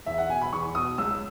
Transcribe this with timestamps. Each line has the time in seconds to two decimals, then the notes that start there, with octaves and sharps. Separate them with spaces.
0.06 E2 E5
0.18 F#5
0.29 B2 G#5
0.41 B5
0.52 E2 C#6
0.75 B2 D#6
0.98 C#2 E6